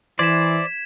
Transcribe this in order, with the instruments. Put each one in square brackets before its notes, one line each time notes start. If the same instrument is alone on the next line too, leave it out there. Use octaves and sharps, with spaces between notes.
[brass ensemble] E3 [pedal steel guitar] C5 D5 [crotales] G#6 B6 E7